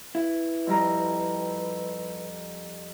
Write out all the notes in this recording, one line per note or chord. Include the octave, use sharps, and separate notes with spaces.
E4 B4
F2 G3 A#5